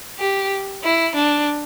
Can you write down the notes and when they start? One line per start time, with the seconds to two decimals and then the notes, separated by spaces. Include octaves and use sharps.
0.19 G4
0.83 E4
1.15 D4